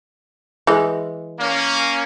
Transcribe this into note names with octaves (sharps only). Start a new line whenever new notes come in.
E3 G#3
A#3 C#4